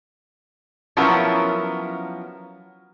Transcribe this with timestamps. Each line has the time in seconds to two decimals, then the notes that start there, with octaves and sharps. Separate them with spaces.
0.97 F3 F#3 B3 C#4 E4 A#4